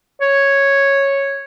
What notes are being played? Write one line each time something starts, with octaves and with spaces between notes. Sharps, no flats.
C#5